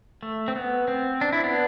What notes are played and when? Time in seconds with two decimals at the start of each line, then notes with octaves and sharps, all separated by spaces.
0.23 A3
0.48 C4
0.56 B3
0.88 C4
1.21 D4
1.33 E4
1.44 B3 D4